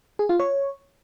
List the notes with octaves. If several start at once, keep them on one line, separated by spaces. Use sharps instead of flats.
G#4
F4
C#5